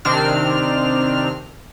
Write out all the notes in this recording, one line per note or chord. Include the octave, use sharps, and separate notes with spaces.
C3 D#3 C4 D4 F6